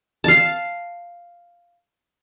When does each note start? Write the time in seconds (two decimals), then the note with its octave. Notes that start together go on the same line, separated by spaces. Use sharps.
0.24 F5 A5